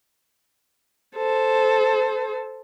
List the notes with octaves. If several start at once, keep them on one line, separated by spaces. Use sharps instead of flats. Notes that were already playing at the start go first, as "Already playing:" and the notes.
A4 C5